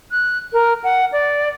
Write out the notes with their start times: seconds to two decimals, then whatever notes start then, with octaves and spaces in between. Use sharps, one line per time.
0.11 F#6
0.53 A#4
0.84 F#5
1.12 D5